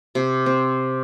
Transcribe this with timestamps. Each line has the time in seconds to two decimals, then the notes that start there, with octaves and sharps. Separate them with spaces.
0.15 C3
0.46 C4